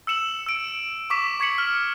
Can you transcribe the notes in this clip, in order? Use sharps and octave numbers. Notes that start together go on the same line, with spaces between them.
E6 C#7 E7 F#7
E6 D7
C#6 D6 B6 E7
C#6 G#6 B6 C#7 F#7
F6